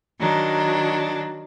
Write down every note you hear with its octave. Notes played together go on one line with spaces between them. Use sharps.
D#3 F#3 D4